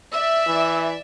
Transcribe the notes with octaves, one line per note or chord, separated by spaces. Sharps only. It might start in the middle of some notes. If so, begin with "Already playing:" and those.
D5 E5 E6
E3